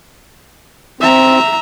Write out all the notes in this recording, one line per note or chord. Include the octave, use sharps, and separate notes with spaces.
C4 E5 A#5